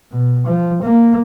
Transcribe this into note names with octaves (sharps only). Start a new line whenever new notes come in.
B2
F3
A#3